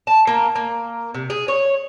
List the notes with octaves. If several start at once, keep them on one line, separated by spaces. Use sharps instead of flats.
A5
A#3
A#3
C3
G#4
C#5